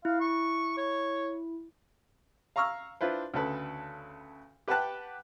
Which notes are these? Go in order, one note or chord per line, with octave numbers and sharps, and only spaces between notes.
E4 F5
C#6
C#5
F5 A#5 C#6 E6 F6
D4 E4 F4 B4 C5
D2 C#3 A4 B4
G4 B4 F#5 G5 A5 F#6